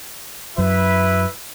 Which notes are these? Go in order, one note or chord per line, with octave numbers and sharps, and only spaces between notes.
F#2 F#3 E4 B4 E5